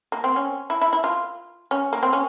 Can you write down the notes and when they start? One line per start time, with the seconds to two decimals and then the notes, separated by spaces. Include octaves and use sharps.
0.12 A#3
0.24 C4
0.36 C#4
0.70 E4
0.81 E4
0.93 E4
1.04 F4
1.71 C#4
1.93 A#3
2.03 C4
2.13 C#4